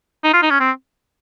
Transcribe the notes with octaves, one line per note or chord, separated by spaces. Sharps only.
D#4
F4
D#4
C#4
C4